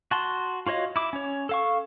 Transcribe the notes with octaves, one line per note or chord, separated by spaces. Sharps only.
F#4 A5 C6
F4 F#4 C#5 D#5 F5
E4 D6
C#4 C#5
A4 F5 C#6